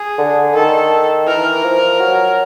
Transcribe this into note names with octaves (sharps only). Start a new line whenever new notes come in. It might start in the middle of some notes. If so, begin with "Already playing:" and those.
Already playing: G#4
D3
D#3 A4
E3 A#4
F3
F#3